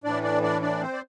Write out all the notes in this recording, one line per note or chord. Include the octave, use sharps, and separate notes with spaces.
A2 E3 D4 D5
D4 D5
D4 D5
D4 D5
C4 C5
D5